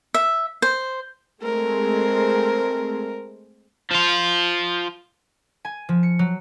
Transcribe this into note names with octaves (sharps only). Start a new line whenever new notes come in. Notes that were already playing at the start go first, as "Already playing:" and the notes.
E5
C5
G#3 A3 C4 A#4
F3 F4
G#5
F3
C#7
F#3